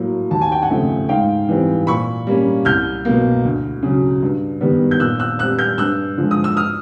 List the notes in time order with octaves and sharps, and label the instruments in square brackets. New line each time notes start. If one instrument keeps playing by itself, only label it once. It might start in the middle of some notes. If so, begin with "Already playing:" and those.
Already playing: [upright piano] A2 F#3 A#3
D#2 A5
G#5
G5
F#5 G#5
C#3 F3 A3 C4
G#2 F5 G5
E3 G3 C4
A#2 B5 C#6
G3 A#3 C#4
C2 F6 G6
B2 F#3 A#3
D2
C#3 F#3
G2
D#3 G3 B3
G6
A#2 E6 F#6
E6 F#6
G3 C4 E6 F#6
F6 G6
G2 E6 F#6
D3 F3 G#3
D#6
E6
D#6 F6